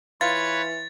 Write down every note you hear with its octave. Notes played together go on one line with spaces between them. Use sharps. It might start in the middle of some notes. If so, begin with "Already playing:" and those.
E3 F4 B4 C#5 A6